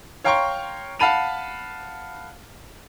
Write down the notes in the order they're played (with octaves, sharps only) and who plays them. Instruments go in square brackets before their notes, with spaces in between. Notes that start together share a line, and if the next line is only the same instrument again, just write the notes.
[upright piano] C#5 F5 G5 A#5 C6 C#6
F5 F#5 A5 B5 D#7 F7